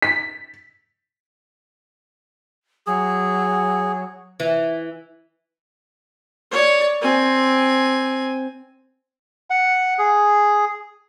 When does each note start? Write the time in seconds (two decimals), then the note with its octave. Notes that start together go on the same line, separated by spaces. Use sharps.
0.02 B6
2.87 F#3 G#4
4.40 E3
6.51 C#5 D5
7.02 C4 G#5
9.50 F#5
9.98 G#4